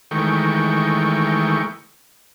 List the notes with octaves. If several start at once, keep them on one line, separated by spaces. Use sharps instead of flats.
D#3 E3 G#3 A3 G5 C#6